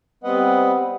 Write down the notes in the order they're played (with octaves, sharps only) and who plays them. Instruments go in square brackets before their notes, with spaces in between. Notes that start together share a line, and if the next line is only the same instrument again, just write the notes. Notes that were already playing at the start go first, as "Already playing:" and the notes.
[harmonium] G3 B3 C4 B4 D#5 F#5